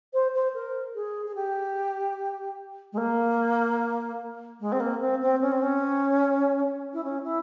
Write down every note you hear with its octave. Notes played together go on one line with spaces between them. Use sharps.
C5
C5
A#4
G#4
G#4
G4
G#3
A#3
G#3
C4
A#3
C4
C4
C#4
C4
C#4
E4
C#4
E4